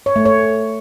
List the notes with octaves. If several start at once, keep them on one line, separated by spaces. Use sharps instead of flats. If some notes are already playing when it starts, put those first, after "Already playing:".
C#5
A3
C#5